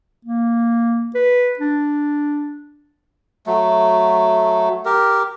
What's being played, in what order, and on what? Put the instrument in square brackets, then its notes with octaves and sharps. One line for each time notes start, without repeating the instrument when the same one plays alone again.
[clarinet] A#3
B4
D4
[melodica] F#3 A3
G4 A#4